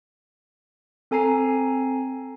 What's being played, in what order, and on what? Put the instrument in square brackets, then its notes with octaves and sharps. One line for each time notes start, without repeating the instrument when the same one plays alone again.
[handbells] C4 A4 G#5 A#5 C7